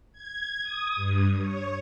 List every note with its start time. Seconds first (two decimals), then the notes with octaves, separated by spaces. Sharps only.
0.13 G#6
0.63 D#6
0.96 G2
1.39 C#5